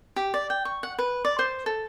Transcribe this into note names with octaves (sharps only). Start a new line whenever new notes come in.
G4
D5
G5
C#6
F#5
B4
D5
C5
A4